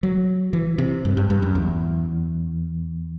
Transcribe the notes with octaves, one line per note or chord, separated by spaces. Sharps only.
F#3
E3
C3
G2
G2
G2
F#2
E2